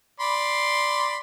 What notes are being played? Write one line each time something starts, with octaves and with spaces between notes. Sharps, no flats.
D5 B5 C6